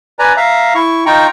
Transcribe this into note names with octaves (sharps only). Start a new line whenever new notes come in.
B4 D5 G#5 A#5
E5 F5 A#5
E4 C#6
D#4 F4 G5 A#5 C#6